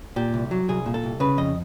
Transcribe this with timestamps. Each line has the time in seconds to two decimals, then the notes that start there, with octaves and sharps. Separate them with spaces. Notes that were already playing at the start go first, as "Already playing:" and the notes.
0.16 A#2 G4
0.34 C2
0.51 F#3
0.69 C2 G#4
0.86 A#2
0.94 A4
1.03 C2
1.20 C#3 B4
1.38 F2 D#5